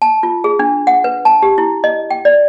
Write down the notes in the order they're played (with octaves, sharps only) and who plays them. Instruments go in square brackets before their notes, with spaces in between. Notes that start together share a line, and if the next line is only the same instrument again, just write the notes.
[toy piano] A5
F4
G#4
D4
F#5
B4
A5
G4
E4
D#5
G5
D5